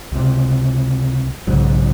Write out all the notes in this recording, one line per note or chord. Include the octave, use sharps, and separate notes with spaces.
C#2 C3
B1 G#2 C#3 F#3